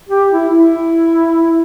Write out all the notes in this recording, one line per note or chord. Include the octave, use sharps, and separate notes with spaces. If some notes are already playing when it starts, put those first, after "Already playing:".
G4
E4
E4